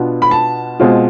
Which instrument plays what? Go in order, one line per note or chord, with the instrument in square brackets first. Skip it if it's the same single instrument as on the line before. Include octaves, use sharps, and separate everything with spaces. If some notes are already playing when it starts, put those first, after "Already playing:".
Already playing: [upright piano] B2 B3 D4 F4
B5
A5
B2 G#3 C4 F4